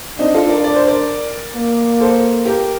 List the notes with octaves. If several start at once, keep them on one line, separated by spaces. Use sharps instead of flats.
C4 D4 D#4
F4 A4
A#4 D5
D5
C5
A#4 D5
A#3
A4 C5
G4 A#4